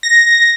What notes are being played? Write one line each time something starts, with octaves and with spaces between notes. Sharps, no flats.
A#6